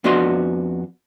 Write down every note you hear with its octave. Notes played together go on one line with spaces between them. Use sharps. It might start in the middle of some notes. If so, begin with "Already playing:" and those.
F2 B3 D4 F#4 D#5 C6